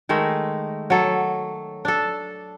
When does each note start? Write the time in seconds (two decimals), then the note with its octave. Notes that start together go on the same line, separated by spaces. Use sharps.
0.09 D#3 G#3 A3
0.90 F#3 A4
1.85 D4 A4